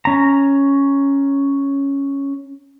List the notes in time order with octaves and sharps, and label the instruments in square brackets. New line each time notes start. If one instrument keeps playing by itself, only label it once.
[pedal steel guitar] C#4 A#5